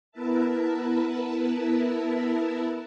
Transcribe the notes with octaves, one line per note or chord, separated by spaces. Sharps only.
B3 E4 A#4 B4 E5 A5